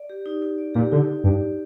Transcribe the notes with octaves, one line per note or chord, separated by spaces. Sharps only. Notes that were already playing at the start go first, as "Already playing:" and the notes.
Already playing: D5
G4
D#4
D#4
D5
A#2 G4
D3 D#4
D#4
G2 D5
G4